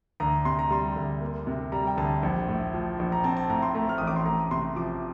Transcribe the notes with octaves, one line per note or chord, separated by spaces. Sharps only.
D2 A#5
C3 C6
A#5
G3 C6
D2
A#3
C3
G3 A#5
G5
D2 A5
A#1
A2
F3
A#1
A#5
C4 A5
A5
A2 A#5
C6
A3 A#5
F6
A1 D#6
D6
C6
A3 A#5
C3 C6
F3 D6